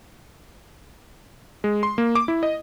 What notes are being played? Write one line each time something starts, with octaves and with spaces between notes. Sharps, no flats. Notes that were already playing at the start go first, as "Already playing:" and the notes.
G#3
C6
A#3
D6
E4
D#5